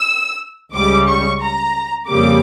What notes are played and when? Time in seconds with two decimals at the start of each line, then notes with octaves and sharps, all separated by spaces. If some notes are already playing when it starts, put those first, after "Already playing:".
Already playing: E6
0.72 C#2 C#3 G3 D6
1.06 C#6
1.40 A#5
2.08 F2 C#3 G3 A#3 D6